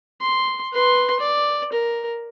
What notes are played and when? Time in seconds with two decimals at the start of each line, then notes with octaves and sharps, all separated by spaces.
0.21 C6
0.72 B4 C6
1.20 D5
1.73 A#4